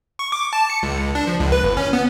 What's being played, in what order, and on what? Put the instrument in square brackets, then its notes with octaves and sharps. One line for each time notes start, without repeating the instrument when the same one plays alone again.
[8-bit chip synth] C#6
D6
A5
C#7
C#2
D4
F3
C#2
B4
G1
C#4
B3